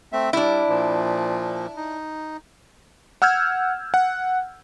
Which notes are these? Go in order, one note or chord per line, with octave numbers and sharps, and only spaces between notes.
A3 C4 E5
G3 D4 E4
A#2 F3
D#4
F#5 E6 F6 G6 G#6
F#5